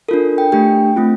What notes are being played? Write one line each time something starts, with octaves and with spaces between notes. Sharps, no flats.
D4 F4 A4 A#4
G5
A3 D4 G4 G5
A3 C4 F4